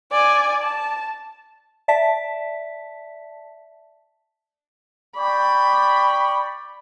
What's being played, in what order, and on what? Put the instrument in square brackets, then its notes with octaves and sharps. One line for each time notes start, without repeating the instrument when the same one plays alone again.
[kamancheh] D5 G#5
A5
[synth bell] D5 E5 A5 B6
[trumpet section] D5 G5 C#6 [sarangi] B5